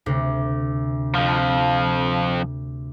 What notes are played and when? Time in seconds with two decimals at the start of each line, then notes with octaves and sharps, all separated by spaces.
0.06 D2 C3
1.15 F2 F3